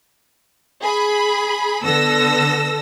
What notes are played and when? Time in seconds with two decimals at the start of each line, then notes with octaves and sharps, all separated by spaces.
0.81 G#4 B5
1.84 D3 B3 A4 E6 A#6